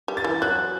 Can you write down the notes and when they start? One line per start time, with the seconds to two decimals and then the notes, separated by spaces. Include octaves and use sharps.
0.08 G3
0.17 A6
0.24 E3
0.42 F#3 F#6